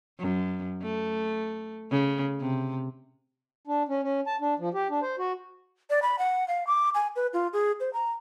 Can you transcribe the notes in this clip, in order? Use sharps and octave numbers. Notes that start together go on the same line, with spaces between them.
F#2
A3
C#3
C3
D4
C#4
C#4
A5
D4
F3
G4
D4
C5
F#4
D5
B5
F#5
F5
D6
G#5
B4
F4
G#4
C5
A#5